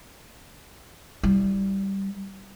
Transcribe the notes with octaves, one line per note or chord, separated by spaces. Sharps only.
G3 E4